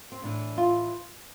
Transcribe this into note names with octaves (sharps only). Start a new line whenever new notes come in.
C4
A2 E3 D4
F4